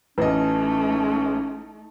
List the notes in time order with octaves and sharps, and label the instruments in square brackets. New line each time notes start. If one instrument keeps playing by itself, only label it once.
[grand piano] A1 D#5 [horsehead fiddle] A3 D#4 [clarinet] C#4 [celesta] B4